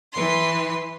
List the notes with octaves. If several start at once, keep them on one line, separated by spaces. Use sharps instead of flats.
E3 B4 C6